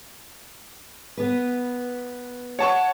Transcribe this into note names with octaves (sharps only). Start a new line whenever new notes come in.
B3 B4
C#5 F#5 A5 C#6